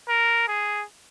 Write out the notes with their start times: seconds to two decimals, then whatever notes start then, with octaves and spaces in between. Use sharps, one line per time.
0.09 A#4
0.48 G#4